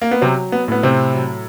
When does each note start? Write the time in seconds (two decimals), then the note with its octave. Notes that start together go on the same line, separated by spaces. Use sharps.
0.02 A#3
0.11 B3
0.21 C3 F#3 C4
0.52 B3
0.68 A2 B3
0.83 C3 C4
1.14 F#3